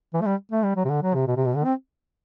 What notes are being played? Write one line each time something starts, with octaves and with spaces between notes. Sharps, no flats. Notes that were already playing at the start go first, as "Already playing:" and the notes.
E3
A3
G3
A3
G3
F#3
C3
D3
F#3
C3
B2
C3
B2
D3
C4